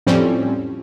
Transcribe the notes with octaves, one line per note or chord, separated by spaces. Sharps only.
F2 A2 F3 G3 C4 C#4